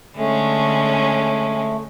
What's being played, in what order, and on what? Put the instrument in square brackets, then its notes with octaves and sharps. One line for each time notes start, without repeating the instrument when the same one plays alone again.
[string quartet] D3 G#3 C#4 [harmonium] A3